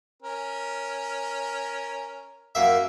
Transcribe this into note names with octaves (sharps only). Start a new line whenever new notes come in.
C#4 A#4
F#2 A#3 E5